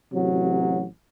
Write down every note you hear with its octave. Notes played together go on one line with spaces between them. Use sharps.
A1 C3 F#3